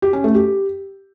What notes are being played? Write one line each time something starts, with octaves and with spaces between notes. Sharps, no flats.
G4
C#4
A3
G4